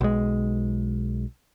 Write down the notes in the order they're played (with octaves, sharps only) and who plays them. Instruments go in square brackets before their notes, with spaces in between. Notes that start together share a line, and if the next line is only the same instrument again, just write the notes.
[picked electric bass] B1 G#3